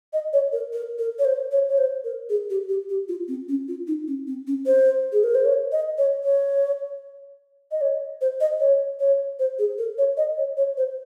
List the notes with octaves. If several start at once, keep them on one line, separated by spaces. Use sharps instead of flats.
D#5
C#5
A#4
A#4
A#4
C#5
C5
C#5
C#5
C5
A#4
G#4
G4
G4
G4
F4
C4
C#4
F4
D#4
C#4
C4
C#4
C5
G#4
A#4
C5
C#5
D#5
C#5
C#5
D#5
C#5
C5
D#5
C#5
C#5
C5
G#4
A#4
C#5
D#5
C#5
C#5
C5